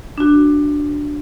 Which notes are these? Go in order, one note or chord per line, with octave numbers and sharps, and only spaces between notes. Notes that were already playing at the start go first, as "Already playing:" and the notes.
D4 F#4